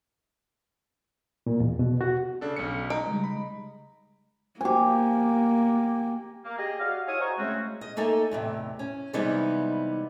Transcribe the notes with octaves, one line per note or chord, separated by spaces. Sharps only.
A#2
E2
B2
F#4
C#3 D4 A4
B1 C#4 C#7
D#4 D7
C#3 G3 G#3
B5
A#3 G4 G#5
A#3
G4 G#4 D#5
F#4 G#4 D5 F5
E4 C#5 E5 F5 G#5 D#6
F#4 C5 D#5 G#5 A#5 C#6
C#3 G#3 A3 C4 C#4 F#4
D#5
A3 A#3 D#4 A4 G#5
E2 A2 C3
C#4
C3 E3 G3 G#3 B3 D#4